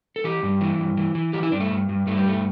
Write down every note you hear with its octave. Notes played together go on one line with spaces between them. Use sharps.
A4
E3 G4
G2
E3
G2
E3
E3
E3 G4
E4
G2 D4
A3
G2
G2
G2 A3
G3
G2 A3